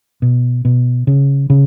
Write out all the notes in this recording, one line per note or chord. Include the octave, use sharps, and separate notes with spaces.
B2
B2
C#3
C#3